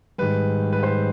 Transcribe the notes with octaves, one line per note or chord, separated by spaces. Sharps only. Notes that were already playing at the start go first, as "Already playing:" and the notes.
G#2 D#3 G3 B4
B4
C5